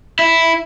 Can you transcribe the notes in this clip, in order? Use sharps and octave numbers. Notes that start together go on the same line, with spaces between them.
E4